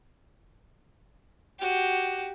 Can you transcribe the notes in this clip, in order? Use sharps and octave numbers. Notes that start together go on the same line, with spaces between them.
F#4 G4